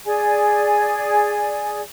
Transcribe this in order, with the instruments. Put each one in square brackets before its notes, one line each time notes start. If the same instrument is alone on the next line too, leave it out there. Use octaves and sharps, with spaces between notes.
[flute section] G#4 D5 G#5